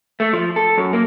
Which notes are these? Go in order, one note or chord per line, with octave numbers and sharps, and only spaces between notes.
A3
F3
A4
F#2
A#3